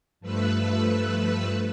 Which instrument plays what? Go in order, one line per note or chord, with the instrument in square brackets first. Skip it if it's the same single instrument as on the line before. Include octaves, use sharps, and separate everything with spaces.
[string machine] G2 F3 A3 B4 E6 F#6